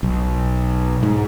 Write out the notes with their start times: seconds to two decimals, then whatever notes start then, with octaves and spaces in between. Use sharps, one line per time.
0.03 B1
1.03 G#2